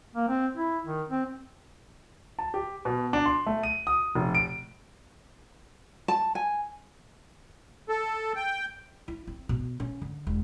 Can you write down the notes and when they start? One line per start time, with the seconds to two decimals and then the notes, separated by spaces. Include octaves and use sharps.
0.16 A#3
0.29 C4
0.56 E4
0.86 D#3
1.10 C4
2.39 A5
2.54 G4
2.85 B2
3.13 D4
3.26 C6
3.46 A3
3.63 D#7
3.87 D#6
4.15 F1
4.35 D7
6.08 A5
6.35 G#5
7.89 A4
8.36 G5
9.08 E4
9.27 C4
9.49 B2
9.80 C#4
10.02 D3
10.27 E1